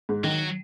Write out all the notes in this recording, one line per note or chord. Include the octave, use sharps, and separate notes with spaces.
G#2
D#3 F#3